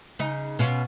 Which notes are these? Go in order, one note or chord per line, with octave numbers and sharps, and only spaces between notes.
C#3 D#4
B2 C#4 F4